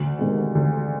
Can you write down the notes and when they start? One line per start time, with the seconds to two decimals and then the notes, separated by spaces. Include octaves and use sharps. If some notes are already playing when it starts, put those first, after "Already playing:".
Already playing: D2
0.19 C3 D#3 G#3
0.55 D2